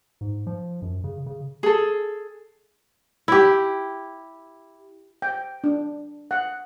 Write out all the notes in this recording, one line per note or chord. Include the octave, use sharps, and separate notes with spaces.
G#2
F3
F#2
C#3
C#3
G#4 A4
E4 G4
G5
D4
F#5